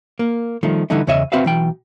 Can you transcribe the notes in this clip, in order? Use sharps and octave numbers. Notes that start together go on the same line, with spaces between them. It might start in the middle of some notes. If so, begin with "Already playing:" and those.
A#3
D#3 F3 G3 A3
D3 E3 G3 A3 D#4
E2 C#3 C#5 D#5 E5
C4 F#4 B4 E5 F5
B1 E3 G5